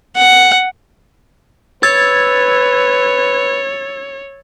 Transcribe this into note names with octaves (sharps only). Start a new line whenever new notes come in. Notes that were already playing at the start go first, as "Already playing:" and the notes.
F#5
B4 C#5 E6 G#6 A6